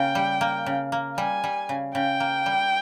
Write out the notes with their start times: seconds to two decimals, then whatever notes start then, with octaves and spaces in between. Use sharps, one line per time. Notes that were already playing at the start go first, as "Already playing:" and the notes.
Already playing: C#3 A#3 G5
0.15 G3
0.41 A#3
0.66 C#3
0.92 A#3
1.17 G3 G#5
1.44 G3
1.69 C#3
1.94 C#3 G5
2.20 A#3
2.46 G3